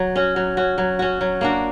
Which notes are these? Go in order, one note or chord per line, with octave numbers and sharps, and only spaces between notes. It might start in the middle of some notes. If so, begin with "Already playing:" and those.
Already playing: F#3
C#4 F#4
F#3
C#4 F#4
F#3
C#4 F#4
F#3
A#3 D4 F#4